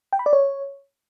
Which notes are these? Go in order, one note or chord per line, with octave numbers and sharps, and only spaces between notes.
G5
B5
D5
C#5